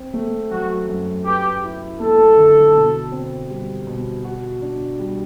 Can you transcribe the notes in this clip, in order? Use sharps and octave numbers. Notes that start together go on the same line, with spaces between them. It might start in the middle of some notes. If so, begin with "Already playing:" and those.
Already playing: C4
A3
F#3 F#4
F#2
G4 B4
E4
A3 A4
D3
B2
C4
G3
B2
F#4
D4
G3